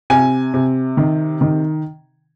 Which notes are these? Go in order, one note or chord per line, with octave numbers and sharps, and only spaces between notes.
C3 G#5
C3
D#3
D#3